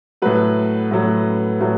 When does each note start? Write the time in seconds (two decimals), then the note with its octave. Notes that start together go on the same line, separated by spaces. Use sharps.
0.22 A2 F#3 B4
0.91 A2 F#3
1.61 A2 F#3